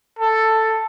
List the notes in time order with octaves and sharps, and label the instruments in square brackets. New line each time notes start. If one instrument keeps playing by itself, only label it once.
[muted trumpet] A4